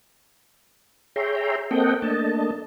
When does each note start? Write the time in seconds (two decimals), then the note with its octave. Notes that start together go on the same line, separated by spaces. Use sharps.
1.16 G#4 C#5 E5 G5 A#5 C6
1.71 A#3 C4 A4 D#5 F#5 G5
2.02 A3 A#3 D4 D#5 A5